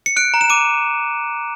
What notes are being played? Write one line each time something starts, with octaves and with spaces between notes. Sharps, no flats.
C#7
F#6 D7
A#5
E7
D6 D#7